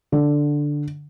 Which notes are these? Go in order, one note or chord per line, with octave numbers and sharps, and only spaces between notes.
D3